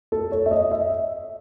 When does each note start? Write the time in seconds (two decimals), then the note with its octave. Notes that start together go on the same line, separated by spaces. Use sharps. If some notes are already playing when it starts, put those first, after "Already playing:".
0.12 A4
0.32 C#5
0.46 E5
0.51 D#5
0.71 E5